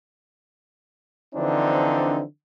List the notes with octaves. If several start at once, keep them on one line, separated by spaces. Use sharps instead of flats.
D3 E3 F3 C4 D4 D#4